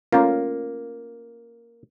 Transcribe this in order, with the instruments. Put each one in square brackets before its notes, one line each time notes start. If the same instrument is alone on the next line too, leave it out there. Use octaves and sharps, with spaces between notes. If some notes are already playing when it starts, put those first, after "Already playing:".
[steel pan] A3 C#4 F4 [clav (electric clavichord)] A#3